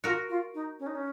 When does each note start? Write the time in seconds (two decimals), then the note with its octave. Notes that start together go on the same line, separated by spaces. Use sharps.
0.04 F4 F#4 A#4
0.30 F4
0.54 D#4
0.80 C#4
0.87 D#4
0.95 C#4